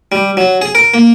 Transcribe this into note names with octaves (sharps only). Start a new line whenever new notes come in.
G3
F#3
G#4
A#4
A#3